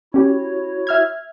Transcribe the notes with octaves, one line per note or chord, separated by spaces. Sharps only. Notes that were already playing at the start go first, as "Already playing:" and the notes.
C#4 E4 F#4 G4 C#5
E5 F6 G#6